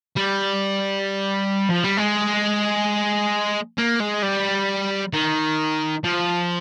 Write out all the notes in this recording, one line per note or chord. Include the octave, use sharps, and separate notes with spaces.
G3
F3
G3
G#3
A#3
G#3
G3
D#3
F3